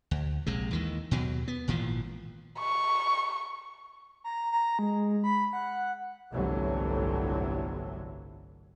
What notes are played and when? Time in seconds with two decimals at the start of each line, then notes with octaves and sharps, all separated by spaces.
0.11 D2
0.46 A#1 C3 G#3
0.71 D#2 D#3 E3
1.11 D#2 B2 F#3
1.48 B3
1.68 G#1 A#2 E3 F3
2.59 C#6
4.24 A#5
4.52 A#5
4.79 G#3
5.24 B5
5.53 F#5
6.32 G1 C2 A2 D3 E3 F#3